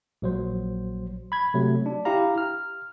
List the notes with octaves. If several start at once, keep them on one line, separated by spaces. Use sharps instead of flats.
A#1 F#3 C5
B5 G#6
C3 F#3 A3
D4
E4 G4 F5 A#5
F6